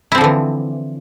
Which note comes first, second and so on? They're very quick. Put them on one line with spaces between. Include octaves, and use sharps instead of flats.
E4 C4 F3 D3 E3